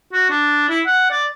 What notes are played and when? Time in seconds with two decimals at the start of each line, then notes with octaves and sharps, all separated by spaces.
0.13 F#4
0.30 D4
0.69 E4
0.86 F#5
1.11 D5